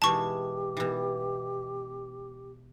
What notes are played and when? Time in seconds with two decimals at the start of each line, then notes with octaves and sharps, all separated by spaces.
0.02 B2 E3 G#3 G4 A5 C#6
0.77 B2 E3